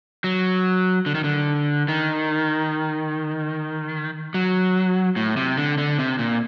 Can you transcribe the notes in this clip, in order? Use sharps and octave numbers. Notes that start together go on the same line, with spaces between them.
F#3
D3
D#3
D3
D#3
F#3
A2
C3
D3
D3
C3
A#2